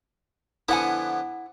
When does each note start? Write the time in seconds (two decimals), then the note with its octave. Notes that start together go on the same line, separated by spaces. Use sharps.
0.68 D3 F3 B3 E4 F#5 G#5